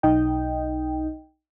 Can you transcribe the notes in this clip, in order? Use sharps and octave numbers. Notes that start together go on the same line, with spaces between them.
B1 D#4 D#5 G5